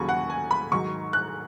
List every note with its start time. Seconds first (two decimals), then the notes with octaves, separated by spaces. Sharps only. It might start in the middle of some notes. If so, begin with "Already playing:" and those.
Already playing: D#2 C#3 F#3 G#5 B5 C#6
0.09 F#5
0.30 G#5
0.51 B5
0.72 G#2 D#3 F#3 C#6
1.13 F#6